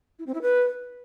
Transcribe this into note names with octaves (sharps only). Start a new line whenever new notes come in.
E4
C4
E4
B4